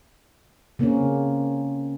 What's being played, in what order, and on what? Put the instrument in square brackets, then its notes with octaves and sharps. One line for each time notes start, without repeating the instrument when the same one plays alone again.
[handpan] C#3 A#3 C4 C#4